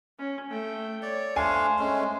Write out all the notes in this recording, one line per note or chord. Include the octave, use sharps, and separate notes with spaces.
C#4
A3 G5
C#5 D5
A3 D4 C5 F5 G#5
G#3 A3 C#4